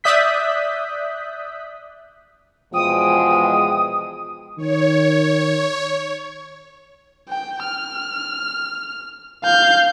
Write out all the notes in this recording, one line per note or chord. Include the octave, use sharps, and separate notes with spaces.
D5 E5 D#6 F#6 G6 B6
E2 B2 F3 G#3 G5 D#6
D#3 C#5
G5
F6
F5 G6